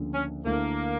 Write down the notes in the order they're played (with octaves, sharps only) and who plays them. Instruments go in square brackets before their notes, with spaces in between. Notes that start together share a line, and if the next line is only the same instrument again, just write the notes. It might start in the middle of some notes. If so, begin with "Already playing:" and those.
Already playing: [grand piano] D2 C#3 F3 A#3 D4
[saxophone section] C#4
[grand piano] D2 D3 A3 E4 [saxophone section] A#3